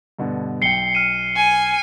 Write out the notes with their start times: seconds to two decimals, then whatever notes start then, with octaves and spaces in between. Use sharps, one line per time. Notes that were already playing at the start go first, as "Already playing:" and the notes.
0.19 G2 B2 D3
0.62 B1 G5 C7 C#7 G7
0.95 F6 D#7
1.36 G#5